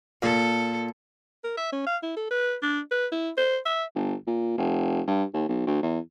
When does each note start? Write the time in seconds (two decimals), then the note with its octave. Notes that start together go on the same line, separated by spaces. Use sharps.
0.22 A#2 A4
1.44 A#4
1.57 E5
1.72 C#4
1.86 F5
2.03 E4
2.16 A4
2.30 B4
2.62 D4
2.91 B4
3.12 E4
3.37 C5
3.66 E5
3.95 G1
4.27 A#2
4.58 F1
5.07 G2
5.34 D#2
5.49 B1
5.67 D2
5.83 E2